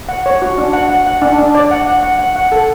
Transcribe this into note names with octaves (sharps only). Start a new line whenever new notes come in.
F#5
C#5
F#4
D4
F#5
F#5
F#5
D4
D4
D5
F#5
F#5
F#5
F#5
F#5
A4